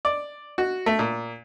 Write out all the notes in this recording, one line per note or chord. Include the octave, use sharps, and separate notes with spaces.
D5
F#4
A3
A#2